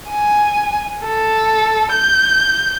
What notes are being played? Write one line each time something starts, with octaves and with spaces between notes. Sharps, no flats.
G#5
A4
G6